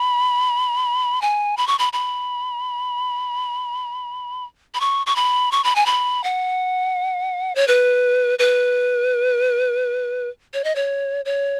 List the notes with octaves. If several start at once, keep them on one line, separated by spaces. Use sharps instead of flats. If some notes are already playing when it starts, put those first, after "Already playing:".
Already playing: B5
G#5
B5
C#6
B5
B5
B5
C#6
C#6
B5
C#6
B5
G#5
B5
F#5
C#5
B4
B4
C#5
D#5
C#5
C#5